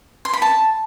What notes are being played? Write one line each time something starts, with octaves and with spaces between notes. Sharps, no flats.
C6
B5
A5